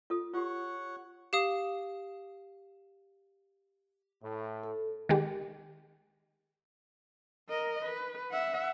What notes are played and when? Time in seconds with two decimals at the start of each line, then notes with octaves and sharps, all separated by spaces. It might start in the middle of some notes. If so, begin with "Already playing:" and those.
0.10 F4 A4 D#6
0.34 F4 G4 C#5 F#5
1.33 G4 F5 D#6
4.23 A2
4.63 A4
5.09 D#3 G#3 G4
7.49 A#4 D#5
7.85 B4
8.31 E5 F#5